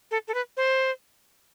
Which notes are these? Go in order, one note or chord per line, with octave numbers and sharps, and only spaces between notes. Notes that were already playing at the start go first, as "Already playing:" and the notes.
A4
A4
B4
C5